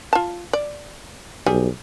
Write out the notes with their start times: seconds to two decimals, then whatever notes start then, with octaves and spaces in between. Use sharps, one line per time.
0.13 F4 A5
0.53 D5
1.46 B1 G3 G#4